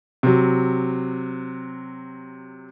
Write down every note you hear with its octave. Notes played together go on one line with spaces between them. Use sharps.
C3 F#3